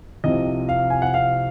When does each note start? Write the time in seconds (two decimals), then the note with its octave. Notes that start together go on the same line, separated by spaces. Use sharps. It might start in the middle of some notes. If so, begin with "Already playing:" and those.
0.24 C2 C3 F3 D#5
0.69 F5
0.90 G#5
1.02 F#5
1.14 F5